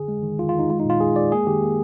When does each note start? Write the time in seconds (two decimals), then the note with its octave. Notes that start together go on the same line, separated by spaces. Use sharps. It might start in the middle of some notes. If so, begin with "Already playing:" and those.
Already playing: D3 G#4
0.08 G#3
0.23 D#3
0.38 D#3 F4
0.49 F4
0.54 D#3
0.59 D#4
0.70 G#3 F4
0.80 D#4
0.85 A#2 F4
1.00 G#3 G#4
1.16 G#3 D5
1.32 A#3 G#4
1.47 D#3 G4
1.62 A#3